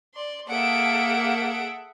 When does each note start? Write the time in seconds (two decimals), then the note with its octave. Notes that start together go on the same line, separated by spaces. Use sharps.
0.14 D5 C6
0.48 A#3 G#4 A4 E5 F#5 D7